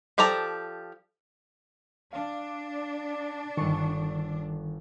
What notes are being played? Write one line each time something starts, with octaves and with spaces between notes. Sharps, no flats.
F3 G4 A4 D5 A#5
D4 F5
G1 D#3 A4 C#6